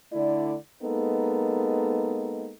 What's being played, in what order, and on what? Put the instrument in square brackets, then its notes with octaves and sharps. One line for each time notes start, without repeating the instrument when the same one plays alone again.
[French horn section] D3 A3 E4 D5
G#3 A#3 B3 D#4 A4